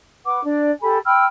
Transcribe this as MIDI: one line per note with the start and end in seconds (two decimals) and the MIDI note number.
0.25 0.42 71
0.25 0.42 78
0.25 0.42 86
0.43 0.70 62
0.43 0.70 74
0.81 0.97 67
0.81 0.97 69
0.81 0.97 80
0.81 0.97 83
1.05 1.24 79
1.05 1.24 83
1.05 1.24 88
1.05 1.24 89